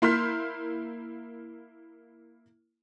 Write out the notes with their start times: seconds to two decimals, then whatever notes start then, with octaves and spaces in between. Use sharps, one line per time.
0.02 A#3 E4 C6 F6 G6 B6